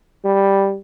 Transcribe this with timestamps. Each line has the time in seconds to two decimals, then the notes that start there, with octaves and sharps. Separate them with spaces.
0.25 G3